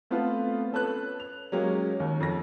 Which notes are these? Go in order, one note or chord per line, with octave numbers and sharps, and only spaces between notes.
A3 B3 C4 F4 A4 B4
C#4 A4 B4 F#6
F7
F#3 G#3 A#3 C#4 G4
D#2
F2 A#6